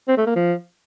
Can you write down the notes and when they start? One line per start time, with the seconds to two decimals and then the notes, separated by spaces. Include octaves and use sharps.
0.08 C4
0.18 A3
0.27 A#3
0.36 F3